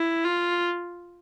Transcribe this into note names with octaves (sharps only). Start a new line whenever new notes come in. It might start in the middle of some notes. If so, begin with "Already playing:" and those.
Already playing: E4
F4